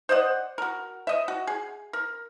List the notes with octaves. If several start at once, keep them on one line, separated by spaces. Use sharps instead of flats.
C5 D5 D#5 F#5
F#4 A#4
D#5 E5
F#4
G#4
A#4